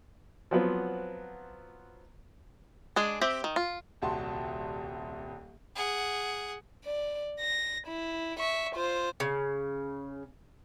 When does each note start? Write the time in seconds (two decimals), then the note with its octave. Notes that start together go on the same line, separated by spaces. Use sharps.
0.51 F3 F#3 B3 C4
2.96 G#3 D4 G#4
3.21 C4 G4 E5
3.44 D#3
3.56 F4
4.02 D#1 C2 F#4 A5 C6
5.75 G#4 F#5
6.85 D5
7.40 A#6
7.87 E4
8.39 E5 C#6
8.75 F4 C5
9.20 C#3